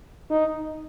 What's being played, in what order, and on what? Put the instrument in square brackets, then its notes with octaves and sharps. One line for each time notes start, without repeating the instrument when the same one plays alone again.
[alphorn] D#4